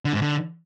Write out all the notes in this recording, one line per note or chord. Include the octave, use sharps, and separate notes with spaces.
D3
G#2
D3